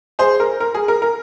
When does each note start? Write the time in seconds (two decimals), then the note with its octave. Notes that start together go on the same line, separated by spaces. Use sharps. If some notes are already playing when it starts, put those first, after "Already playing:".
0.19 G#4 C5
0.40 A#4
0.60 A#4
0.75 G#4
0.88 A#4
1.02 A#4